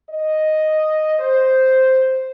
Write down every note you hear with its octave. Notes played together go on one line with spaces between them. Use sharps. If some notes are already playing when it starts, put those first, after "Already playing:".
D#5
C5